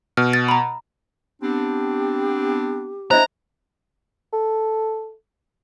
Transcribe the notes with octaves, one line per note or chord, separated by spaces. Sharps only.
B2 F6
A6
A#5 B5
B3 C4 D4 G4
B3 D4 E4 C5 D#5 E5 A#5
A4